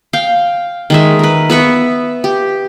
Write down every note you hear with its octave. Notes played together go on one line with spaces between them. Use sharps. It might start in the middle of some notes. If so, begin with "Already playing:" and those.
F5 G5
D#3 G#3 E5
A#4 B4
B3 B4 E5 C#6
G4